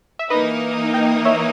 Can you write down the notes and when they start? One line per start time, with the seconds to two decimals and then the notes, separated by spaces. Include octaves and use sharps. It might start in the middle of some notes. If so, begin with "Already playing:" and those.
0.19 E5
0.30 E3 A#3 D#4 B4 D#5
0.93 D#5 G5
1.25 C#5 E5